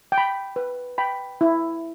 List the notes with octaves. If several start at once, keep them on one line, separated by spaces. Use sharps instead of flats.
G5
B5
B4
G5 B5
E4